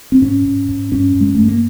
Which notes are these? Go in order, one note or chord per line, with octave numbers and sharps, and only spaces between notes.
C4
G#2 C#4
G#2
G#2
G2 C#4
G2
G#3
G2 A3
A#3